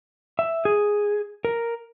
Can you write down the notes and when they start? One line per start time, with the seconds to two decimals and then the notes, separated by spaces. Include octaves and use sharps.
0.39 E5
0.65 G#4
1.45 A#4